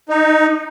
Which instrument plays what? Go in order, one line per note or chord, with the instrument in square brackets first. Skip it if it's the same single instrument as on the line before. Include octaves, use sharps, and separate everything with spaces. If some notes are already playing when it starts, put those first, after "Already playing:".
[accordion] D#4